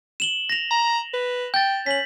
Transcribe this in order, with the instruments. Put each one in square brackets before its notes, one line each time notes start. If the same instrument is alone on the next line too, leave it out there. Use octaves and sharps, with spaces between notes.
[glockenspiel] E7 F#7 G7
A#6 F7
[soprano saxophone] A#5
B4
[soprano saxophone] G5 [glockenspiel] G6 A6
[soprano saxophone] C#4 [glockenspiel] B6 F#7